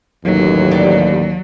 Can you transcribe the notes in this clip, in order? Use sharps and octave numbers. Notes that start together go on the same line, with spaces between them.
A1 D#2 F#3
G3